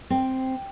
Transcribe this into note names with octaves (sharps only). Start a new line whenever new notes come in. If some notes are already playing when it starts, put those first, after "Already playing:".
C4